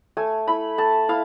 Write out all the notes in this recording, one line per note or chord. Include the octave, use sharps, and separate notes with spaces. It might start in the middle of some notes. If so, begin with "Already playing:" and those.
A3 G#5
E4 B5
A3 A5
E4 F5